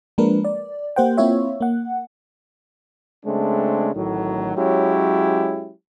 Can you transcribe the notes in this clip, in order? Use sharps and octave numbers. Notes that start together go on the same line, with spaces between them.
F3 G#3 A#3 D4 A#4 B4
D5
A#3 G4 C5 F#5 G5
A#3 C4 E4 F4 C#5 E5
A#3 F#5
C#3 G#3 A3 C4 D4
A1 A2 D#3 F#3
F#3 G#3 C#4 E4 G4